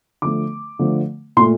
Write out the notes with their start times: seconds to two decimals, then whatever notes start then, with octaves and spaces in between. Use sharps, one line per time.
0.22 D3 F3 A3 D6
0.79 D3 F3 A3
1.37 A#2 A3 C6